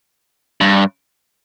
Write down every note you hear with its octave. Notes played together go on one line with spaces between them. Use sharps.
G2